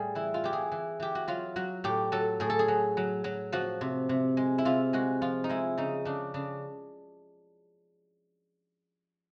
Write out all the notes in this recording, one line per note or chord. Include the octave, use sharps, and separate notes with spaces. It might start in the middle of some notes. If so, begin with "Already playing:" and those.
Already playing: A2 G3 G#4
E3 E4
F4
E3 G4
G#4
E3
E3 G4
F#4
F#3 F4
F#3 F#4
A2 G4
F#3 A4
A2 G#4
A4
G#4
F#3
F#3
F#3
F3 F#4
C3
C3
G#3
E4
C3 F4
G#3 F#4
F3 F4
D#4
G#3 E4
C#3 D#4
C#3 D4
C#3 D4